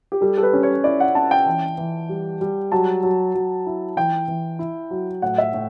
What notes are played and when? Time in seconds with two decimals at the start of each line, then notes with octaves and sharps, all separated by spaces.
0.12 G4
0.21 G3 A4
0.38 A4
0.43 B4
0.53 C#4
0.63 C#5
0.84 E4 D5
1.00 F#5
1.15 C#4 A5
1.31 G5
1.46 E3
1.78 E3
2.09 G3
2.41 G3
2.72 F#3 A5
3.03 F#3
3.35 F#3
3.66 E4
3.97 E3 G5
4.28 E3
4.59 E4
4.91 F#3
5.22 A2 F#5
5.38 E5
5.54 A2